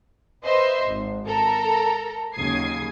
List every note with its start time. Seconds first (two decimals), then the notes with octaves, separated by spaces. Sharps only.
0.43 B4 C5 D#5 E5 C6
0.84 G#1
1.27 A4 A#4 A#5
2.34 D#2 C#3 F#3 D#6 G#6 C7